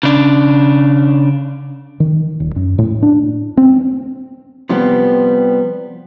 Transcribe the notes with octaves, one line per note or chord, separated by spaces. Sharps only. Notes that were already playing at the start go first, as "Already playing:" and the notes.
C#3 D4
D#3
D#1
F#2
A2
D4
C4
C3 F3 G3 B3